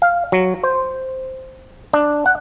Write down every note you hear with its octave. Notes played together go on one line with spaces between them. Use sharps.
F5
F#3
C5
D4
F#5